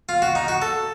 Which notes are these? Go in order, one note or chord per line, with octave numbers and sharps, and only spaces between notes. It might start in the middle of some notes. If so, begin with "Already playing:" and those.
F4
F#4
D#4
F#4
A4